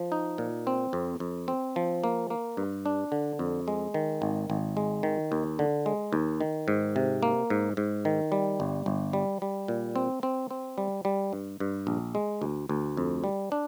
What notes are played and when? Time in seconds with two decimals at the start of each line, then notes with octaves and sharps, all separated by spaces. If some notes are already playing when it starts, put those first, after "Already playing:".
Already playing: F3
0.12 D#4
0.38 A#2
0.67 C4
0.93 F2
1.20 F2
1.48 C4
1.76 F3
2.04 A#3
2.30 A#3
2.57 G2
2.86 D4
3.12 D3
3.39 F2
3.68 G#3
3.94 D#3
4.22 G#1
4.50 G#1
4.77 G#3
5.03 D#3
5.32 D#2
5.59 D3
5.86 G#3
6.13 D#2
6.41 D#3
6.68 G#2
6.96 C3
7.23 A#3
7.50 G#2
7.77 G#2
8.05 D#3
8.32 G3
8.60 G1
8.86 G1
9.13 G3
9.42 G3
9.68 A#2
9.96 C4
10.23 C4
10.51 C4
10.78 G3
11.05 G3
11.33 G2
11.60 G2
11.87 A#1
12.15 G#3
12.42 D2
12.69 D2
12.97 F2
13.24 G3
13.52 D4